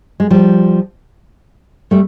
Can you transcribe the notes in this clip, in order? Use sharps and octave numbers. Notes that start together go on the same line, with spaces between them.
G#3
F3 G3
G3 A3